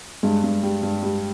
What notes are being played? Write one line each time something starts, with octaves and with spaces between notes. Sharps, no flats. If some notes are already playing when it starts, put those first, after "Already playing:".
G2 G#3
G2
G3
G2
G3